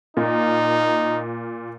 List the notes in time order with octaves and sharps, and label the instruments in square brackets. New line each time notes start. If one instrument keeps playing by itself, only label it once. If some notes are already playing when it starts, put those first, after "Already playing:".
[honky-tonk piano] A#2 A#3 [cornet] D#4